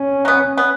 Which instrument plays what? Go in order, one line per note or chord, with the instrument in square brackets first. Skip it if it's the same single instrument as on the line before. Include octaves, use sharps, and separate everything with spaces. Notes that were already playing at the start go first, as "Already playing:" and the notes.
Already playing: [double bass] C#4
[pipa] F#3 B3
B3